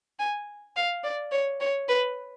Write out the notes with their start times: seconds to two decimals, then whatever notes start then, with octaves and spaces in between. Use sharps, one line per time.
0.19 G#5
0.76 F5
1.04 D5
1.32 C#5
1.60 C#5
1.88 B4